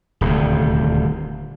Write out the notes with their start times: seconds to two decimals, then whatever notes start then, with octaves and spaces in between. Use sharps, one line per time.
0.21 D#1 D2 C3